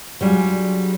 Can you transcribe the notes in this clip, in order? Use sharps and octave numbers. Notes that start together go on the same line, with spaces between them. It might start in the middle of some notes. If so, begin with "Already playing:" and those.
F#3 G3 D4 F4 G#4